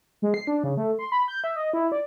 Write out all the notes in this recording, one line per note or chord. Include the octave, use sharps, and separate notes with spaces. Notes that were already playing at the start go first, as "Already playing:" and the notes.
G#3
C7
D4
C#3
A3
C6
B5
G6
E5
D#5
E4
D5